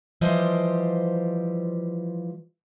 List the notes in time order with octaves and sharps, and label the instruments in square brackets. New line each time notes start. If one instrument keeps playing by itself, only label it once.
[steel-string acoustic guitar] E3 F3 G3 G4 C5 D#5